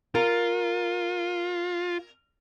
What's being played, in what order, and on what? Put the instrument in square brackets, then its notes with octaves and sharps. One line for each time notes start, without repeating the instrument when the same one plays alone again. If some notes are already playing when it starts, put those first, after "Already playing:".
[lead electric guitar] F4 [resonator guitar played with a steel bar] A#4